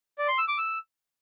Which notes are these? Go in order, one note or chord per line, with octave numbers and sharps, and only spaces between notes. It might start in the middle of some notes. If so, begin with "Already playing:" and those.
D5
C6
E6
D6
E6